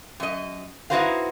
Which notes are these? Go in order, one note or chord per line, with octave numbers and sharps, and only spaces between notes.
F#2 D#5
D#4 E4 F#4 B4 C5 F5